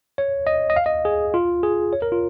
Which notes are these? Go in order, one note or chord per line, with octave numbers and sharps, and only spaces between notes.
C#5
D#5
D#5
F5
D#5
G#4
F4
G#4
C#5
A#4
F4